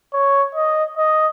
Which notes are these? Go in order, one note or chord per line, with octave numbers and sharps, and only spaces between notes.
C#5
D#5
D#5